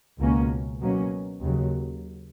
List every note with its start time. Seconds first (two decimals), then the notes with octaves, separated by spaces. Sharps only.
0.18 C#2 B2 A#3 C#4
0.80 B2 F#3 A#3 C#4
1.42 D#2 C#3 F#3